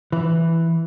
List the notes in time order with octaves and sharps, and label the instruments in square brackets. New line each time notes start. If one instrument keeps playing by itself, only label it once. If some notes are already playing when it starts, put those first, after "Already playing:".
[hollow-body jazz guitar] E3